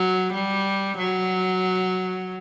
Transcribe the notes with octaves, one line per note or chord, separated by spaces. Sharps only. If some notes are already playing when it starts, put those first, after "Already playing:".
Already playing: F#3
G3
F#3